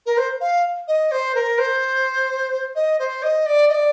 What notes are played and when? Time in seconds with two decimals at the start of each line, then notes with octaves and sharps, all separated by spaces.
0.06 A#4
0.17 C5
0.40 F5
0.87 D#5
1.11 C5
1.35 A#4
1.58 C5
2.75 D#5
2.99 C5
3.22 D#5
3.46 D5
3.69 D#5
3.72 D5